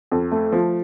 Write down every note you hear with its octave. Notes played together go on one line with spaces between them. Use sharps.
F2
A3
F3